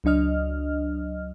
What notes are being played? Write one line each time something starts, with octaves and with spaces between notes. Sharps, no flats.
C#2 F#3 D4 D#5 F6